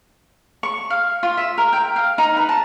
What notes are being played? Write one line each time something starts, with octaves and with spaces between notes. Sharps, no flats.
C#6
F5
F4
E5
A#4
G5
F5
D#4
B4
A5